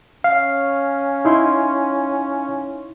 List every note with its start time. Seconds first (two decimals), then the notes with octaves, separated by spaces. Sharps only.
0.24 C#4 F5
1.25 D#4 E4 C6